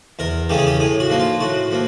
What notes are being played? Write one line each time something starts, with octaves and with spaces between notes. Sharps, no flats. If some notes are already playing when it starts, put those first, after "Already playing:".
E2 A#4
C#3 E3 A3 C#4 G4
G#4
G4
A2 G#4
F#4
F3 A#3 D#4
F4
A2 F#4
F3 A#3